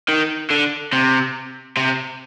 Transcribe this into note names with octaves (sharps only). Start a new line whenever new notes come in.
D#3
D3
C3
C3